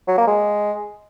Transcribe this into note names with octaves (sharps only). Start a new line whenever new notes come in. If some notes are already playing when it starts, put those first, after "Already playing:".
F#3
A#3
G#3